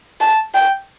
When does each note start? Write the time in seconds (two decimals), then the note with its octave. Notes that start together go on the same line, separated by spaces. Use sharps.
0.21 A5
0.55 G5